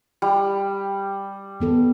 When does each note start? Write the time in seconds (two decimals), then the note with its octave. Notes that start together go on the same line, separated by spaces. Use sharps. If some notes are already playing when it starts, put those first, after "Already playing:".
0.22 G3
1.60 D#3 B3 A4